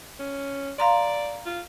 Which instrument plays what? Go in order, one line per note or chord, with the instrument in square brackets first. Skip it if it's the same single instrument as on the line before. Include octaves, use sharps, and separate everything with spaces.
[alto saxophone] C#4
[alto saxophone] D5 [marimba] F5 A#5 C6
[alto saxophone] F4